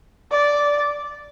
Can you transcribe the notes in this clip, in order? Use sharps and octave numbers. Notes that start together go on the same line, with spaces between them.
D5